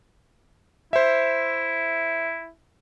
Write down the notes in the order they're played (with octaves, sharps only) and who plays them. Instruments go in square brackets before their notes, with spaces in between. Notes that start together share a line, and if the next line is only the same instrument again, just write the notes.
[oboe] E4 [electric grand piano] C5 E5